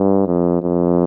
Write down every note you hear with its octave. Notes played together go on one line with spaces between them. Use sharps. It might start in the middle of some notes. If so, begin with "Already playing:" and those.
Already playing: G2
F2
F2